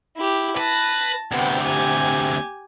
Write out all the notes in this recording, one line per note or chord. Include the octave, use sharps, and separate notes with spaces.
E4 G4
B4 A5 A#6
D2 C3 B3 G5
G4 G#5